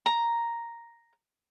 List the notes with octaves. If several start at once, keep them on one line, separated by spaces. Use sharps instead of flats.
A#5